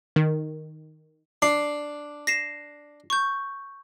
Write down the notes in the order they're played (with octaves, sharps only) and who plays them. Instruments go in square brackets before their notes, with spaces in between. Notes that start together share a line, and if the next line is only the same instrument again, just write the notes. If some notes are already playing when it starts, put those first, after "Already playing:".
[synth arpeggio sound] D#3
[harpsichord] D4 [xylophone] C7
[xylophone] A#6 C7 E7
C#6 G6